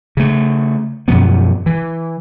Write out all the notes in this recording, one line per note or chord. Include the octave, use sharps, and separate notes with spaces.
C#3 A3
F#2 B2 F3 B3
E3